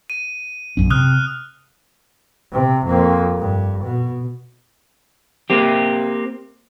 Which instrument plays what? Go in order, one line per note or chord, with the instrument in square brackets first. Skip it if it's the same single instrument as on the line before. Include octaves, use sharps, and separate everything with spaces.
[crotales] D#7
[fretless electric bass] B1 F#2 C#4
[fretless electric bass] C3 [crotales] D#6 F6 F#6
[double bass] C3
F2 A#3
G2
B2
[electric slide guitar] A#3 C4 G4